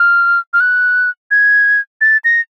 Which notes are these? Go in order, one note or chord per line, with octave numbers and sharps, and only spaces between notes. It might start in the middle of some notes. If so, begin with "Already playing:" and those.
Already playing: F6
F6
F#6
G#6
A6
A#6